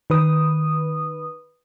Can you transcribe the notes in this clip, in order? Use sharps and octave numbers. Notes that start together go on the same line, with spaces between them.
D#3 B4 D#6